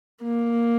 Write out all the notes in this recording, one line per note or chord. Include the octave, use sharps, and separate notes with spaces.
A#3